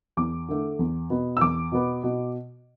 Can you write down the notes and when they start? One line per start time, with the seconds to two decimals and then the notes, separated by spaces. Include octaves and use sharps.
0.17 E2 D6
0.49 D3 A3
0.79 E2
1.10 B2 B3
1.37 E6
1.41 E2 D6
1.72 B2 B3
2.03 B2